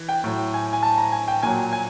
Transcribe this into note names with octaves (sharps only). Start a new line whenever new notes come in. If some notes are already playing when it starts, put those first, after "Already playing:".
Already playing: E3
G5
A2 F#3
G#5
G#5
A5
A#5
G#5
G5
A#2 F#3 G#5
G#5